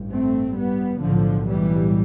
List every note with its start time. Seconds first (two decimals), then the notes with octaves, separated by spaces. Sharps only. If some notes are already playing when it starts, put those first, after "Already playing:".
Already playing: A1 G2
0.11 A3 C4
0.56 G3 B3
1.01 B1 A2 D3 F3
1.47 E3 G3